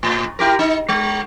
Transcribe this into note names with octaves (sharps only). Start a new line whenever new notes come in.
A2
E4 G4 A#4
D#4
G#3